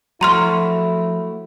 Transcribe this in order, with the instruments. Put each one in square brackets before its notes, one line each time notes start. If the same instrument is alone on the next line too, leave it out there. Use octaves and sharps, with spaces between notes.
[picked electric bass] F3 F#3 [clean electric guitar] A3 F#4 [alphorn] E4 [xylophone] A#5 C6 F6